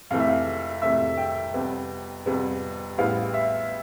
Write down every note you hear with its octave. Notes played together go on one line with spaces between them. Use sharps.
F2 C3 E3 A3 F5
E5
F5
F2 C3 E3 A3 E5
G5
F2 C3 G3 B3
F2 C3 G3 B3
A1 A2 G3 B3 F5
E5